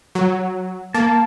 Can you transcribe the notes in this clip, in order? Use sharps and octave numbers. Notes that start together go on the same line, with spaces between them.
F#3
A#3 A5